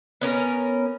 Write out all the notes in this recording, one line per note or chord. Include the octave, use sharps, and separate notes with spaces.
B3 C#4 A#4